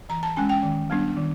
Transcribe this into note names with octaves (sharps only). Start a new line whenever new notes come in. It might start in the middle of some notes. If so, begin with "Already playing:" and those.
E3 A#5
A5
G#3 C#4 G#5
G5
D#3
G3 B3 D4
D#3